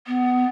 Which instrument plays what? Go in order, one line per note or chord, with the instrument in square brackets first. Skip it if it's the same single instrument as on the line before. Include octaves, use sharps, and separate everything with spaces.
[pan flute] B3